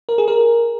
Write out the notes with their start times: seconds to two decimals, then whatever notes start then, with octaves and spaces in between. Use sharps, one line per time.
0.09 A#4
0.18 G#4
0.28 A#4